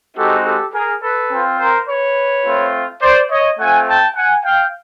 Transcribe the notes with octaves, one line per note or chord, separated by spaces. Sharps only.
G#3 C4 D#4 F#4 G4 A4
G4 A4
G#4 A#4
A4 B4
C4 F4
A#4 C5
B4 C#5
A3 C4 F4
C5 D5
C#5 D#5
A3 C4 F4 F#5 G#5
G5 A5
F#5 G#5
F5 G5